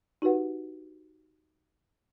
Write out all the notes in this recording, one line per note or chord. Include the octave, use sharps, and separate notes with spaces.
D#4 F#4 G4 B4 F#5